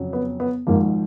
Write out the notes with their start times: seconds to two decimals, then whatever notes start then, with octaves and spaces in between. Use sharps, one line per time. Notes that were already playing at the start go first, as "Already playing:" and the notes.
Already playing: F2 C#3 F#3
0.13 B3
0.40 B3
0.67 G#1 G#2 F3 A#3